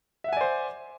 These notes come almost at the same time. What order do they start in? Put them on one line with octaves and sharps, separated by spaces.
E5 F#5 G#5 D5 C5